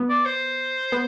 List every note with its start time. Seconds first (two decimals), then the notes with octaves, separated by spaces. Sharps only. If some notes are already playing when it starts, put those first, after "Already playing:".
Already playing: B3
0.09 D5
0.25 C5
0.92 B3